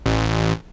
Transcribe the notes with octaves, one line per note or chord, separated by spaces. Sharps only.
A1